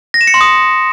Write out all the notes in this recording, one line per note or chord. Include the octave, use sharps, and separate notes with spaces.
A#6
E7
C#7
C6
D#6